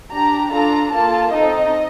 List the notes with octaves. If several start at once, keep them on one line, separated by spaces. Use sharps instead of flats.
D4 G4 A#5
D4 F4 A4 A#5
A#3 F4 A4 A5
C4 D#4 A4 D#5